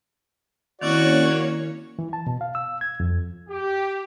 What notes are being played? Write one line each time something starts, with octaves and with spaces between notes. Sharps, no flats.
D#3 A#3 C4 C#4 E4 F#4 C#5 D5
E3
A5
B2
F5
E6
G#6
F2
G4